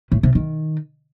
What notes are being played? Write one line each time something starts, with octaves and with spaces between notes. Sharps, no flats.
A2
C3
D#3